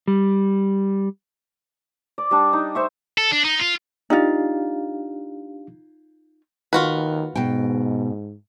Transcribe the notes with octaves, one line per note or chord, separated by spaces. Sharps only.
G3
D5
G3 D4
D#4
C5 E5 C#6
A4
D4
D#4
F4
D4 D#4 F4 G4 F5
D#3 F4 F#4 B4
G#2 B2 G5